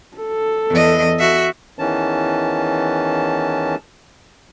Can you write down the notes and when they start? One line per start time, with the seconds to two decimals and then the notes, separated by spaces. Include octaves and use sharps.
0.17 A4
0.70 E2 D#5
1.19 F#4 E5
1.79 E2 D#3 E3 C#4 A5